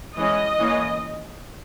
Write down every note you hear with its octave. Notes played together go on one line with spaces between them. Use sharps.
E3 G#3 C#4 D#5
E3 A#3 C#4